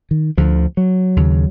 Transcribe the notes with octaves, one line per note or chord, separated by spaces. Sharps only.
D#3
D2 D3 F3
F#3
D#2 C#3